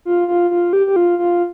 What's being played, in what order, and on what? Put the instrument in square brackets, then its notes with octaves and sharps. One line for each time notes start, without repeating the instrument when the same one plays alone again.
[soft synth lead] F4
F4
F4
G4
G4
F4
F4